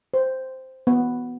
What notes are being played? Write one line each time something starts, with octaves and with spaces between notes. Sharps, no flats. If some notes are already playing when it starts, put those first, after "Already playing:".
C5
B3